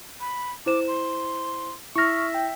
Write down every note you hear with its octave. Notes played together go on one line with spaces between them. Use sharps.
B5
E4 C5 D6 E7
C6
E4 E5 C#6 F6 A#6
G5